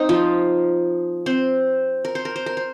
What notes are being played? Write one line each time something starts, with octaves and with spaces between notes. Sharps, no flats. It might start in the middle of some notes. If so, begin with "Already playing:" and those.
Already playing: C4 D#4
F3 F4
C4 C5
A#4
C5
A#4
C5
A#4
C5